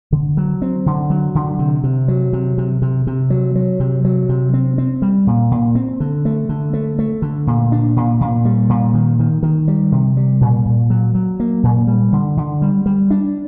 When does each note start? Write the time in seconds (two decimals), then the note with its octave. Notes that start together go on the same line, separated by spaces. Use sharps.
0.12 D3
0.37 F#3
0.62 C4
0.86 D3
1.10 F#3
1.35 D3
1.59 C3
1.84 C3
2.08 F#3
2.33 C3
2.58 C3
2.82 C3
3.07 C3
3.30 F#3
3.56 F#3
3.80 C3
4.05 F#3
4.29 C3
4.54 C4
4.78 C4
5.02 G3
5.27 A#2
5.51 A#2
5.75 C4
6.00 D3
6.25 A3
6.49 D3
6.73 A3
6.99 A3
7.22 D3
7.47 A#2
7.72 D4
7.96 A#2
8.21 A#2
8.45 G3
8.69 A#2
8.94 D#3
9.19 D#3
9.43 D#3
9.68 G3
9.92 C3
10.17 G3
10.41 A#2
10.66 A#2
10.90 F#3
11.15 F#3
11.40 A#3
11.63 A#2
11.87 G3
12.12 D3
12.37 D3
12.62 G3
12.86 G3
13.11 D4